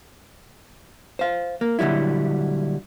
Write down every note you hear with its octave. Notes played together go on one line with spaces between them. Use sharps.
C5 F5
A#3
A#2 D3 F#3 G3 E4